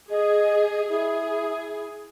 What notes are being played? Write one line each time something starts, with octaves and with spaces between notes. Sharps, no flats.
G#4 D#5
E4 G#4